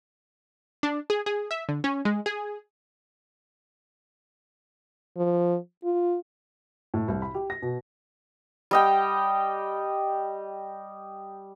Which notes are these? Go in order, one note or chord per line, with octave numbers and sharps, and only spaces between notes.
D4
G#4
G#4
E5
D3
C#4
G#3
G#4
F3
F4
A2
C2
B5
G4
A#6
B2
G3 D#5 G5